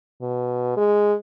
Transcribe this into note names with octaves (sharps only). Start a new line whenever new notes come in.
B2
G#3